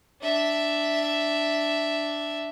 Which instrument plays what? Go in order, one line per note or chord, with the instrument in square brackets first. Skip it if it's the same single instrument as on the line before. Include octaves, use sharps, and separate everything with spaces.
[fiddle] D4 E5